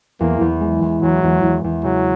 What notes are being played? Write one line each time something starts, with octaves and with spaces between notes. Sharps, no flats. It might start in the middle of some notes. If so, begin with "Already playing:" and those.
E2 A#3
E2
G#3
E2
E2 F#3
E2
E2
E2
C#3 F#3